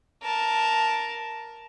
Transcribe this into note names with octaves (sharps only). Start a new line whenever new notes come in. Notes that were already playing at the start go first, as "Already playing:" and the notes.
A#4 A5